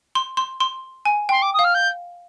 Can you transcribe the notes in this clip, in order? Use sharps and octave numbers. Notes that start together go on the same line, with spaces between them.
C6
C6
C6
G#5
G5 C6
D6
D#6
F5
F6
G6